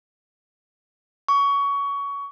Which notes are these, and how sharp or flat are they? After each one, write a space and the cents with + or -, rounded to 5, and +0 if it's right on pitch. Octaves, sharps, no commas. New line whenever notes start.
C#6 +20